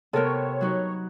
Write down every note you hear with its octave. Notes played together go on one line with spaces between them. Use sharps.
C3 B3 A4 A#4 C#5
F#3 D#4 F#4